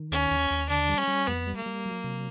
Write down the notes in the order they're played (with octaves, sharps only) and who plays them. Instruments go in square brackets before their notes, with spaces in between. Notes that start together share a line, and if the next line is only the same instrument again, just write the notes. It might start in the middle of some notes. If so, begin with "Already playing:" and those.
Already playing: [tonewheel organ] D#3
[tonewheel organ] D#2 [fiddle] C#4
[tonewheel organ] D#2
D#2
[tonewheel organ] D3 [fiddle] D4
[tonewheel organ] G3
[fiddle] C#4
[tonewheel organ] G3
[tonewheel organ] F2 [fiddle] B3
[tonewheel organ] G3
[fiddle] A#3
[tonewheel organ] G3
F#3
C3